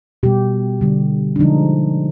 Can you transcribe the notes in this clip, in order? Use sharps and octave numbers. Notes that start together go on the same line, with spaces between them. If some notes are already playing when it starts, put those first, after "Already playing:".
B2 G3 G4
D3 G3
D4
D3 F3 G#3 D#4